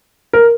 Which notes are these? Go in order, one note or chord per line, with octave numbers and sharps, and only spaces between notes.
A#4